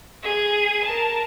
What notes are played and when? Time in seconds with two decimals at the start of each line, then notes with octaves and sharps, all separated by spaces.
0.23 G#4 D#7
0.84 A#4 A5